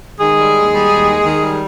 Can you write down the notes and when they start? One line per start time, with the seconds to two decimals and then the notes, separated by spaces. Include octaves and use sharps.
0.19 D#3 G#3 G#4
0.37 G3
0.54 D#2
0.72 G3
0.90 D#2
1.06 D#3
1.24 D#3
1.41 G3